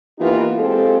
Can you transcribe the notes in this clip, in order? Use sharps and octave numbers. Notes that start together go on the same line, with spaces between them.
E3 A#3 B3 D#4 F4 G4
G#3 C4 F4 G4 A4